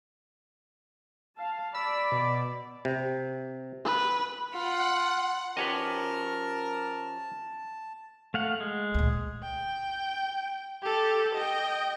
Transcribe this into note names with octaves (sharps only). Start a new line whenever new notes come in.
F5 A5
D5 B5 E6
B2
C3
B4
F4 F#5 B5
F3 C#4 G4 A#4 B4 C#5 D#5 A5
A3 F5 F#5
G#3
D2 A#2
G5
G4 A4
D#5 G5